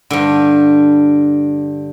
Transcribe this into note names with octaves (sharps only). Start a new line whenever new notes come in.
G2 D3